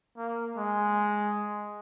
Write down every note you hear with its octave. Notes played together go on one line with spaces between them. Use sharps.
A#3
G#3